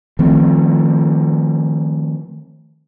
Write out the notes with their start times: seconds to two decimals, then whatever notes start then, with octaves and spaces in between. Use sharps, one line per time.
0.19 D#3 F3 A3 C4